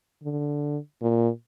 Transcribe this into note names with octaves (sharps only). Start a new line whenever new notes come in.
D3
A#2